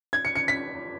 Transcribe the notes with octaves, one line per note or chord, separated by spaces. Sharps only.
G#6
C#7
C#7
B6